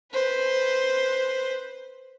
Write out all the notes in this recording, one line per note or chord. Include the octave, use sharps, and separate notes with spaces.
B4 C5